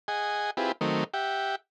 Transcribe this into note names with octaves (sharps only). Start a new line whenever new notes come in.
G#4 D#5 F#5 G#5
C4 E4 F4 G4 G#4 B4
D#3 F#3 A3 C4 A#4 D#5
G4 E5 F#5 G5